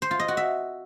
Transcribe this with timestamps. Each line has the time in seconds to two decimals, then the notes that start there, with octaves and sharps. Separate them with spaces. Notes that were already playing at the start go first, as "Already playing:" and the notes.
0.02 C5
0.11 F4
0.20 D#5
0.28 F#4
0.37 E5